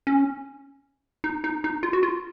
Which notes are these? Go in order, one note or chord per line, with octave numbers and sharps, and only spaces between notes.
C#4
D#4
D#4
D#4
F4
F#4
F4